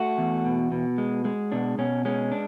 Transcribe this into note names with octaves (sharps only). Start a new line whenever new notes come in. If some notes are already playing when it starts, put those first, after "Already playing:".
Already playing: A3 F#4
E2
B2
B2
G#3
G#3
B2 D4
B2 C#4
G#3 C#4
D4